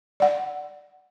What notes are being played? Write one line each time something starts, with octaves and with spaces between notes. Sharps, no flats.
D5 F#5